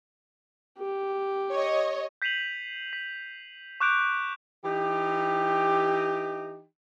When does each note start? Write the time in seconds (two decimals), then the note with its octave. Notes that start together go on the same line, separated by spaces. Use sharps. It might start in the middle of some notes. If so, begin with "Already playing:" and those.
0.78 G4
1.51 C#5 D#5
2.22 G6 B6 C7 D#7 F7 F#7
2.93 B6
3.80 C#6 D6 F#6 G6 D7 F7
4.64 E3 D#4 G4